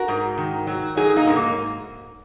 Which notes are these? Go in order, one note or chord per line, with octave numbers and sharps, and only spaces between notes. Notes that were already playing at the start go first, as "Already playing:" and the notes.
Already playing: F#4 A#4
G#2
D#3
F#3
F#3 D#4 G#4
A#3 D#4
G#2 G#3
A#3